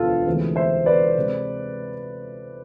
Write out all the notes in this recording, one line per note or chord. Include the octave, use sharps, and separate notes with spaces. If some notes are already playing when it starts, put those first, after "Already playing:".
Already playing: E1 D2 D3 F3 B3 F4 A4
D2 C3 E3 G#3
C5 E5
B4 D5
C3 G#3